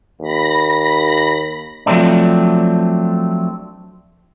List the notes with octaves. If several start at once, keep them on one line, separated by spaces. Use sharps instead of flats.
D#2 B5 A#6 B6
F3 F#3 A3 C4 D4